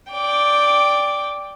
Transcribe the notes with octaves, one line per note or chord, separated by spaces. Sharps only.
D5 G5